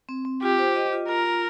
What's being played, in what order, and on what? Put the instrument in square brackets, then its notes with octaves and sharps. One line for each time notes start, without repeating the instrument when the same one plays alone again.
[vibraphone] C4
C4
[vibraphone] F4 [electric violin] G4
[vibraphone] C5
D#5
F4
[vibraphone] F4 [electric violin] A#4
[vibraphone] F4